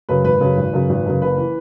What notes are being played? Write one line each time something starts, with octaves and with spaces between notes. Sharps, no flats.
F#2 C#3 B4
G#1 B4
F#2 C#3
G#1
F#2 C#3
G#1
F#2 C#3
F#1 B4
E3